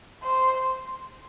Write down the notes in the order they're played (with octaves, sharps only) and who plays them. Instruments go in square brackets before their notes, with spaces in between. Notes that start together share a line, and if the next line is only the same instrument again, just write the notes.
[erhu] C5